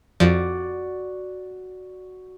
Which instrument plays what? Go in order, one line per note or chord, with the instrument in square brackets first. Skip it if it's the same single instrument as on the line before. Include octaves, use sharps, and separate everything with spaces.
[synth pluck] F2 F3 [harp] F#4 D5